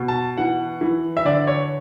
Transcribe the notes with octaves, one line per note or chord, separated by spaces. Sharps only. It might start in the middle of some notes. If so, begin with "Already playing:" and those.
Already playing: B2
A5
E3 F#5
E3
E5
D3 D5
C#5